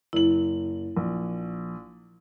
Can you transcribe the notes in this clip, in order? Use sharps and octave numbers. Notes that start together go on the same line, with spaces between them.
F#1 E4 F#7
A#1